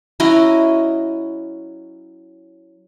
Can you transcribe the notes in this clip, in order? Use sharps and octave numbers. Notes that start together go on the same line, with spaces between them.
F#3 C#4 E4 D#5